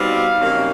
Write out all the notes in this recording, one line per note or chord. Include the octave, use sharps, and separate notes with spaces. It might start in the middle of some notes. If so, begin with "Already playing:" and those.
Already playing: B2 G3 C4 D#4 F5
C3 D#3 F#3 A#3 C#4